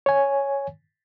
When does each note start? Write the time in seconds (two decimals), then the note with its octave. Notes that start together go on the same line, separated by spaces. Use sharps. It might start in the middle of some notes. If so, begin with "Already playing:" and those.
0.06 C#5 G#5